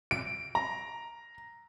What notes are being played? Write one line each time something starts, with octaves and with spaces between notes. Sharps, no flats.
D7
A#5